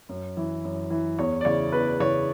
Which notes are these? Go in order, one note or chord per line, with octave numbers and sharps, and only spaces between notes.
F#2
E3
F#2
E3
E2 C#5
D5
C#3 E3 C#5
E2 B4
C#3 E3 C#5